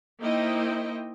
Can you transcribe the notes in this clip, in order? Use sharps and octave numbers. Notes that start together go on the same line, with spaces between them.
A#3 D#4 E4 C5 D#5 G5